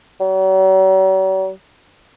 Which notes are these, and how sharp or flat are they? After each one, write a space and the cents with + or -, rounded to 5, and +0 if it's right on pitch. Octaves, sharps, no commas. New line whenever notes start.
F#3 +45